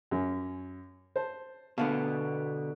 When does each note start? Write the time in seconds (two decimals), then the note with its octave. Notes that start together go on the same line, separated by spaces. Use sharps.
0.11 F#2 C#4
1.16 C5 A5
1.78 B2 D3 B3 F5 A5